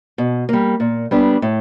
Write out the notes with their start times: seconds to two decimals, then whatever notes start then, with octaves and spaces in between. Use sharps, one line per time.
0.18 B2
0.49 G3 A#3
0.80 A#2
1.11 G3 B3 D4
1.42 A2